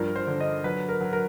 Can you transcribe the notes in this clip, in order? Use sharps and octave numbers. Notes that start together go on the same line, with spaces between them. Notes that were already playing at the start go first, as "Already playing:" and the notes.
Already playing: G2 F3 A#4
C5
D3
D#5
F#3 B4
A#4
F#3
A#4